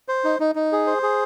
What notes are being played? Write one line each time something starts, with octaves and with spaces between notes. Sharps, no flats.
C5
D#4
D#4
D#4
G#4
C5
G#4